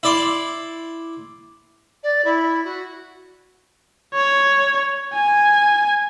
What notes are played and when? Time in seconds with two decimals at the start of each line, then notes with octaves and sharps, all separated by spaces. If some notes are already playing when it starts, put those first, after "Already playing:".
0.03 E4 D5 C6
2.03 D5
2.25 E4
2.64 F#4
4.14 C#5
5.13 G#5